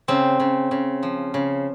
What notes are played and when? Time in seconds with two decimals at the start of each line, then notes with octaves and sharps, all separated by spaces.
0.08 C#3 C4
0.40 C#3
0.71 C#3
1.03 F3
1.34 C#3